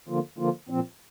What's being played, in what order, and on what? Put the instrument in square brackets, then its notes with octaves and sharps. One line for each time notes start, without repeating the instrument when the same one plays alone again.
[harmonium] D3 F3 A#3 F4
D3 F3 A#3 F4
A#2 F3 C4